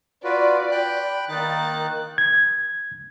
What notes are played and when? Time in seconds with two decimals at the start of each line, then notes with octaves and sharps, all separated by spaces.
0.24 F4 F#4 B4 D5
0.71 G5 B5 F#6
1.29 D#3 A#3 D#4 F#6 A6
2.18 G#6